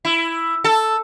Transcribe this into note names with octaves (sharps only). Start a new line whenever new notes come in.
E4
A4